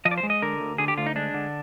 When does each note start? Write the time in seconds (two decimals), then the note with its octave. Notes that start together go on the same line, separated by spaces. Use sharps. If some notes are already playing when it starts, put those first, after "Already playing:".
0.05 F3 D#5
0.11 D5
0.18 C5
0.23 G#3
0.30 D#5
0.42 D3 A#4
0.60 D2
0.78 D3 G#4
0.88 G4
0.98 D2 F4
1.06 D#4
1.16 G#3 D4
1.34 D3